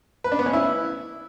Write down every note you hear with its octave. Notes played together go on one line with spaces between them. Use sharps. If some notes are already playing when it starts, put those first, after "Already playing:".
B4
D4
B3
C#4
E4